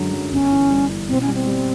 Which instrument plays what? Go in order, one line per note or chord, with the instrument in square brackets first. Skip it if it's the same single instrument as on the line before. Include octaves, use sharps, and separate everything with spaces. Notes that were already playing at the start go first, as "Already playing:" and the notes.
Already playing: [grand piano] F#2 D3 F#3 G#3
F#2
[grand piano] G1 [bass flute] C#4
[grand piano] E3
G2
E3
[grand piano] B2 [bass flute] C4
[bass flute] C#4
[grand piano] G3
[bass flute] C4
[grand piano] G3